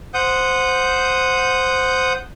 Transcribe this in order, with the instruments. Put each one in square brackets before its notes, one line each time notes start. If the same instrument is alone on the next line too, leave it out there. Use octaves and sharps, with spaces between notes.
[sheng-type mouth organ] C5 F#5 D#6 G6